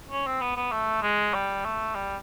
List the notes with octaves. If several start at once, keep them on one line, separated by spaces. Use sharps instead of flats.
C#4
C4
B3
B3
A3
G#3
G3
A3
G3